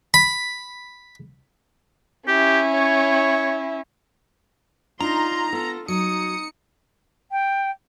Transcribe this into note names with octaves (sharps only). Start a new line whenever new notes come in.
B5
C#4 E4 G4
C#5
D4 D#4 F4 A#5 C6
B3 F4 A4
F#3 D#4 D#6 C#7
G5